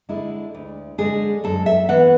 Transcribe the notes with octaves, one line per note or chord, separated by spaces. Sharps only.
D3 G#3 E4
D2
D3 G#3 G#4
F#2 A4
E5
E3 B3 F#5